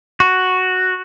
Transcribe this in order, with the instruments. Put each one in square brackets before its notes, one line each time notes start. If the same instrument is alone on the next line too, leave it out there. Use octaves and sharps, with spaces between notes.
[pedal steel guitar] F#4